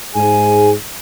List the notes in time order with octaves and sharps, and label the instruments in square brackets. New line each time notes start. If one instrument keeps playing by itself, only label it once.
[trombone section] G#2 G#4 [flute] G#5